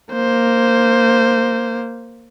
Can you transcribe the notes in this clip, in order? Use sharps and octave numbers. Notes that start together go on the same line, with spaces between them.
A#3 C5